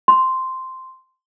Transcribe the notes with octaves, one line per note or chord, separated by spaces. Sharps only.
C6